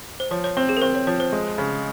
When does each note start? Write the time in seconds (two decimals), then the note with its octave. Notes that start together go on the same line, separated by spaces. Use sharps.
0.20 C5
0.31 F3 C#5
0.44 C#5
0.57 C4 C5
0.69 G#4
0.77 A#4
0.82 C4 C5
0.95 C#5
1.07 F3 C#5
1.20 C5
1.33 G#3
1.58 C#3